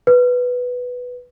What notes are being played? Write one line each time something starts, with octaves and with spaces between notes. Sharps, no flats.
B4